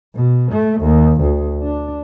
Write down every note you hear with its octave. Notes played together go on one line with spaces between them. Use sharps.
B2
A3
D#2
D2
D4